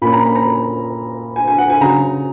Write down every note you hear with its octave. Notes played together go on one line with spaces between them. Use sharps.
A#2 A#3 C#4 B5
A#5
B5
A#5
G#5
G#5
F#5
G#5
C#3 F#3 A#5